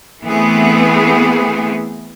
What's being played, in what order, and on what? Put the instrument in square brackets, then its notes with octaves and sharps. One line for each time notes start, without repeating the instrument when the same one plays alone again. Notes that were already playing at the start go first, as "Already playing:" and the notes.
[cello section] E3 A3 B3 C4 G#4